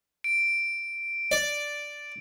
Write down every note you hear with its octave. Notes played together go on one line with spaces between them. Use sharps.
D7
D5